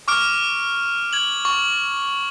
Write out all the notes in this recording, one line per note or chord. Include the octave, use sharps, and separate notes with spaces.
C#6 D6 F6 D7
G#6 F#7
C#6